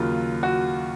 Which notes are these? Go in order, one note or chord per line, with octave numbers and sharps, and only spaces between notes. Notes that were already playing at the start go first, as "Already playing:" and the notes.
Already playing: D#2 C#3 F#3 F4
F#4